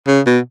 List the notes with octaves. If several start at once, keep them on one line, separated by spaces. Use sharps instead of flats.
C#3
B2